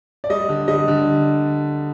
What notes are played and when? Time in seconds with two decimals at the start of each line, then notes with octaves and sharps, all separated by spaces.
0.24 D5
0.30 G3 D#5
0.49 D3
0.68 G3 D#5
0.88 D3